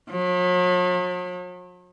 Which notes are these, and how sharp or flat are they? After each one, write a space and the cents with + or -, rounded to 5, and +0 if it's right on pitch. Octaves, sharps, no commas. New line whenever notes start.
F#3 -45